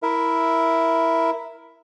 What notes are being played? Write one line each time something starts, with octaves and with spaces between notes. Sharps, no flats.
E4 A#4 E5